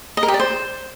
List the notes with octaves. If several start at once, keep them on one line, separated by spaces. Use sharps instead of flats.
D#5
A#4
G4
D5
C5